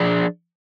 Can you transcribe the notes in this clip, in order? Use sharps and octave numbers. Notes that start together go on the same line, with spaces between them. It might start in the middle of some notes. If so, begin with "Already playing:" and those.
Already playing: F3 D4 G#4